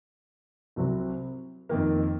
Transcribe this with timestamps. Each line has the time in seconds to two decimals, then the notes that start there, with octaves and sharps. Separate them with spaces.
0.76 C2 C3 F#3 C4
1.69 F2 D#3 A#3